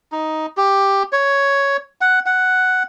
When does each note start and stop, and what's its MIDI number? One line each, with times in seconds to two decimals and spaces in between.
0.12 0.46 63
0.57 1.03 67
1.13 1.77 73
2.01 2.19 78
2.26 2.83 78